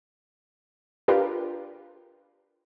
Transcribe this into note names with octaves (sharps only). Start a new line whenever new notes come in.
D4 F4 G4 A#4 B4